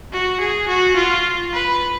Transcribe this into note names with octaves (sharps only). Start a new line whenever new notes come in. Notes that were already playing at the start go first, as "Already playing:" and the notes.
F#4
G#4
F#4
F4
B4